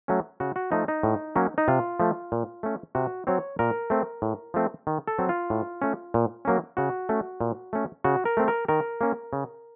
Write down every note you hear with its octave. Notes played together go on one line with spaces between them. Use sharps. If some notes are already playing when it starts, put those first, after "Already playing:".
F#3 A3 C#4
C#3 F#4
F#4
F3 A3 D#4
D#4
A2
F#3 A#3 C#4
D#4
C3 F4
F3 A3
A#2
A3 C#4
C3 F#4
F#3 C4 C#5
A#2 A#4
A3 C4
A2
F3 A3 C4
D#3
A4
F#3 C4
F4
A2
A3 C#4
A#2
F#3 A#3 C#4
C#3 F#4
A3 C#4
A#2
A3 C#4
C#3 F#4
A#4
A3 C4
A#4
D#3 A#4
A#3 C#4
C#3